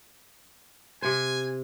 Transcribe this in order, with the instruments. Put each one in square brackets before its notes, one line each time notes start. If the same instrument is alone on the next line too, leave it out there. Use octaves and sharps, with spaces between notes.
[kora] C3 C5 [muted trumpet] G#5